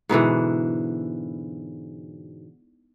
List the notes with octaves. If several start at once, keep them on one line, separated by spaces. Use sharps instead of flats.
G#2 B2 D3 E3